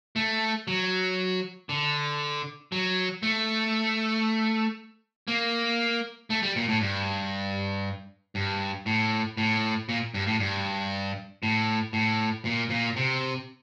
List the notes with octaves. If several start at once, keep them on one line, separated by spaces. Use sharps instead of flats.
A3
F#3
D3
F#3
A3
A#3
A3
G3
A#2
A2
G2
G2
A2
A2
A#2
G2
A2
G2
A2
A2
A#2
A#2
C3